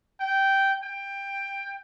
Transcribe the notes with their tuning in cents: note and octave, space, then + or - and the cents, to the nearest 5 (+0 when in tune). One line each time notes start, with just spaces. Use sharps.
G5 -10
G5 +15